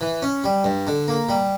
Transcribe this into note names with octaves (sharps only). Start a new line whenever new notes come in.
E3
C#4
G3
G2
D3
A#3
G3